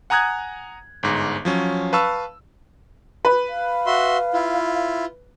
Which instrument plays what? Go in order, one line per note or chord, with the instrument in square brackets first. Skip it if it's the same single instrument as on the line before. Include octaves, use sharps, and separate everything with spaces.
[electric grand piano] F#5 G#5 A#5 D#6 F#6 G#6
G1 G#2
F3 F#3 C#4
B4 F5 A5 C#6 E6
[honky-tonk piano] B4
[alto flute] F5
[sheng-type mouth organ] F#4 E5 C6
E4 F4